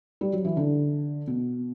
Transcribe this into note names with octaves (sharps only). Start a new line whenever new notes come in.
G3
F#3
E3
D3
B2